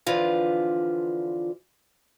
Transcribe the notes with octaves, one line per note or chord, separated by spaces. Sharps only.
D3 E3 F3 F4 B4